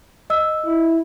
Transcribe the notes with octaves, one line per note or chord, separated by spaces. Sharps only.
D#5 E6
E4